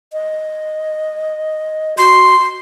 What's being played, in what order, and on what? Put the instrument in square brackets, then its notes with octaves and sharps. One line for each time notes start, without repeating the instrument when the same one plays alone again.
[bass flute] D#5
[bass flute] F#4 [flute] C6